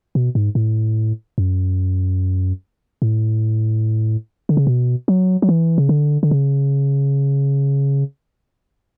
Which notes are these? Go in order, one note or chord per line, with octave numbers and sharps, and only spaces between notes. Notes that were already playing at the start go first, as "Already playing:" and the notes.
B2
G#2
A2
F#2
A2
D3
C#3
B2
F#3
F#3
E3
C#3
D3
D3
C#3